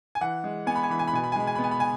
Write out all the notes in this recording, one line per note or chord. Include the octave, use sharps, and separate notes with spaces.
G#5
E3 F#5
G#3
B3 G#5
B5
G#5
E3 B5
G#5
B5
B2 G#5
B5
G#5
G#3 B5
G#5
B5
B3
G#5
B5
G#5